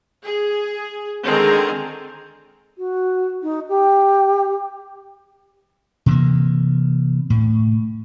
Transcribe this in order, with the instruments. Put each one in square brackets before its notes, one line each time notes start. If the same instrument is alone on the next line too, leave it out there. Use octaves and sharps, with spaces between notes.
[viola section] G#4
D3 D#3 G#3 C4 G#4 A#5
[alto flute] F#4
D#4
G4
[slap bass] C3 E3 A#3
A2